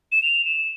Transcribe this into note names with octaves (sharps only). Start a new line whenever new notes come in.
E7
F7
E7